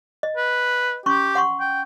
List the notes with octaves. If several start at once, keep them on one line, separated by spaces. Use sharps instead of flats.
D#5
B4
C#4 G4 C6 C#6
F#5 C6 C#6
G5